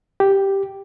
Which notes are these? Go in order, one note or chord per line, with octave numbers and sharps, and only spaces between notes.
G4